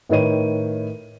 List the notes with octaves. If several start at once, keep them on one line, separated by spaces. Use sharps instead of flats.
A2 D#3 B4 C#5 D#7